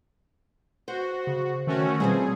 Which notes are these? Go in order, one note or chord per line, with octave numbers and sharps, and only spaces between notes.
F#4 C5
C#3
D#3 A3 C#4 F#4
B2 F3 G3 C4 G#4